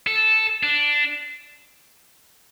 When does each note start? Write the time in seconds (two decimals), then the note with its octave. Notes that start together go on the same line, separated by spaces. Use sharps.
0.07 A4
0.63 D4